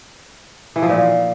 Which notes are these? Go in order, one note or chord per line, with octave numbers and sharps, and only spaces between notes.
E3
F3
A#2